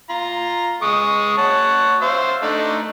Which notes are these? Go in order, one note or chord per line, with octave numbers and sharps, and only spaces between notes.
F4 A#5
G#3 C#6 D#6
C#5 F#5 A5
C5 E5 F5
A3 D4 D#4